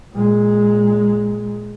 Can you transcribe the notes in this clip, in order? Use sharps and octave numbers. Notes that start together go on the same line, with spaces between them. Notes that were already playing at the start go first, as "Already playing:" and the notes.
A#2 G#3